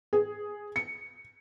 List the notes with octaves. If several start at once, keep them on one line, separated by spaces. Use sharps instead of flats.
G#4
C#7